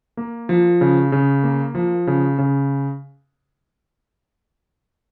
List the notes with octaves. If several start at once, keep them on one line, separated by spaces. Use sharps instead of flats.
A#3
F3
C#3
C#3
A#3
F3
C#3
C#3